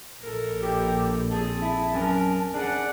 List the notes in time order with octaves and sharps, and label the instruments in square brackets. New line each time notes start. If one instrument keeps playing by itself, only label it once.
[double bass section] A#1 [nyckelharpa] A4 A#4
[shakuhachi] G4
[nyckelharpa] C4 G#4 [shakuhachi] A5
[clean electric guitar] E4
[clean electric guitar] F#2 C#4 G#5 [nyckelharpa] A#4
[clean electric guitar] D4 G#4 [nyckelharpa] D5 F#5